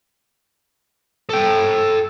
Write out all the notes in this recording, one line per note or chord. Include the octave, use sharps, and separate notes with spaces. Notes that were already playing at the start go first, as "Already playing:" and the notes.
A4 G5